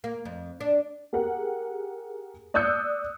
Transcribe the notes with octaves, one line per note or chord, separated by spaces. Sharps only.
A#3
F2
D4
G4 G#4 A#4 F#5
D5 D#6 E6 F#6 G6 C#7